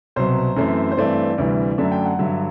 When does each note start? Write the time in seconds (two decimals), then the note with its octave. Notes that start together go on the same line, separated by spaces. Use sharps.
0.16 C2 B2 F#3 C5
0.56 F#2 E3 A3 C4
0.92 C5
0.97 G2 E3 A3 C4 D5
1.38 D2 C3 E3 G3
1.78 F#2 D3 F#3 A3 D4 E5
1.92 G5
2.06 F#5
2.19 G2 D3 F#3 E5